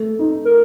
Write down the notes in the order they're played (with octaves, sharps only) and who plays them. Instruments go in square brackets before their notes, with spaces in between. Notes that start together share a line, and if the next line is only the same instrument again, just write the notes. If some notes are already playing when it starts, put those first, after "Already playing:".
Already playing: [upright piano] A3
D#4
[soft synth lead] A#4